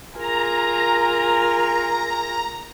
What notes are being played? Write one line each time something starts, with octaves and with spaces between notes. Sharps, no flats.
F4 G#4 A#4 A#5